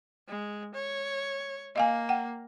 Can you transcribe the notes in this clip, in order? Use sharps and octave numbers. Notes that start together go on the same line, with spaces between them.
G#3
C#5
A#3 D#5 F5 G#5
F#5 G5